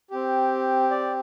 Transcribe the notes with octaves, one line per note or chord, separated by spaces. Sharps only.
C4 G4
D5